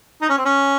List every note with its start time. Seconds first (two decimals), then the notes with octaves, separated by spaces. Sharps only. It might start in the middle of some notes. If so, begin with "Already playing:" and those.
0.21 D#4
0.29 C#4
0.37 C4
0.45 C#4